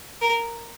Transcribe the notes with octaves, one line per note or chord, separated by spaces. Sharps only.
A#4